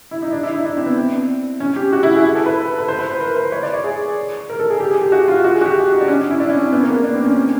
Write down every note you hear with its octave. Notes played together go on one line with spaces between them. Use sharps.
E4
D#4
D4
E4
D#4
D4
C4
B3
C4
C#4
G4
F#4
E4
G#4
A4
B4
B4
B4
C5
B4
C5
A#4
B4
C#5
D5
C#5
G#4
A#4
A4
G#4
G4
G#4
G4
F#4
F4
F#4
G#4
F#4
G4
D#4
D4
C#4
E4
D4
C#4
C4
B3
A#3
B3
D4
C4
C#4
C#4